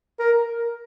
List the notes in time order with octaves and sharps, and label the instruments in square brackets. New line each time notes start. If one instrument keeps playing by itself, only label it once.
[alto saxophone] A#4